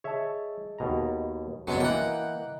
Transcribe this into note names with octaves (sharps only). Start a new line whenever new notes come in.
G#4 C#5 D#5 E5 A5
D#2 B2 A#5
F#2 F#3 G#3 B3 D4 C#7
E3 A#3 D#5 F#5 G5 A#5